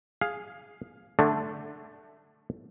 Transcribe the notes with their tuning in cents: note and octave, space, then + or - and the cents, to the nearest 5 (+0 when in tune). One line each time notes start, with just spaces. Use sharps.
G#4 +0 F5 +10
D3 +15 A3 +0 D4 +0